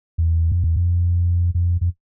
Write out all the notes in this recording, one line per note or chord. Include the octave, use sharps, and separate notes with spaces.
E2
F2
E2
F2
F2
F2